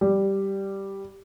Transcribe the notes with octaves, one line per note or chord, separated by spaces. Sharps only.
G3